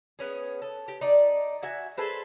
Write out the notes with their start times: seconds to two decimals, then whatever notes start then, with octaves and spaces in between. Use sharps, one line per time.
0.19 B3 C#4 G#4
0.62 A4
0.88 G4
1.01 D#4 D5
1.63 F#4 E5 G#5
1.97 G#4 A4 B4 C5